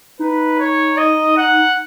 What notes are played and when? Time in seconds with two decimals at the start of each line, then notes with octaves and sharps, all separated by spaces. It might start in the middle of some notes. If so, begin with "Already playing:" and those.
0.19 D#4 B4
0.59 C#5
0.97 D#5
1.38 F#5